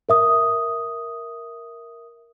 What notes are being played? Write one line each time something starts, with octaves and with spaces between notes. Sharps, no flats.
A#4 E5 D#6